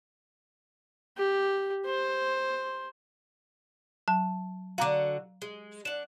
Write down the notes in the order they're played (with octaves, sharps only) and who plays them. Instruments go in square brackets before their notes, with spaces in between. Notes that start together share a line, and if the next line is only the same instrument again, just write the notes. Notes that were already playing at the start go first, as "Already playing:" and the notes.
[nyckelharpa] G4
C5
[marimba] F#3 [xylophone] A5
[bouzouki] D3 F#4 [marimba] F5 A#5 D6
[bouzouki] G#3
[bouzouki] D4 F#5 [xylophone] E7